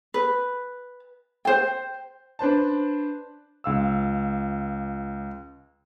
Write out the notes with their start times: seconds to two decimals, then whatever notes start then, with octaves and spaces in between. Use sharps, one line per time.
0.14 B4
1.45 C5 G5
2.39 D4 B4 C5 A5
3.64 C#2 F5 E6